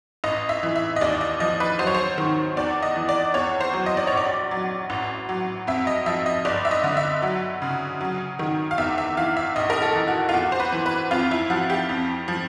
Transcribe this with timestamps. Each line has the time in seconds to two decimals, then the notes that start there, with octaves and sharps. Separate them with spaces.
0.24 A1 D#5
0.49 E5
0.63 E3
0.76 E5
0.96 D#5
1.01 D#2 D5
1.21 D#5
1.40 F3 D#5
1.60 B4
1.79 F#3 C5
1.87 C#5
1.94 C5
2.18 D#3
2.57 E2 D5
2.82 D#5
2.96 E3
3.09 D5
3.34 E2 C#5
3.61 C5
3.73 F#3
3.86 D#5
3.97 D5
4.07 A#1 C#5
4.17 D5
4.51 F#3
4.90 A1
5.29 F#3
5.67 F2 E5
5.87 D#5
6.06 F3 E5
6.26 D#5
6.45 G1 D5
6.65 E5
6.71 D#5
6.84 D3
6.97 E5
7.22 F#3
7.62 C#3
8.01 F#3
8.39 D#3
8.71 F5
8.78 E2 E5
8.98 E5
9.17 E3 F5
9.37 E5
9.56 A#1 D#5
9.70 A#4
9.82 A4
9.95 E3
10.08 F#4
10.29 F4
10.34 E2 F#4
10.52 C5
10.60 B4
10.72 E3
10.86 B4
11.11 F2 F4
11.31 E4
11.50 F3 F#4
11.70 G4
11.89 F2
12.28 F3